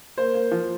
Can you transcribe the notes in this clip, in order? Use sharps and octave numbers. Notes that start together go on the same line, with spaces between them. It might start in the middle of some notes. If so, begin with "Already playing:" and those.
A#3 C5
A#3
F3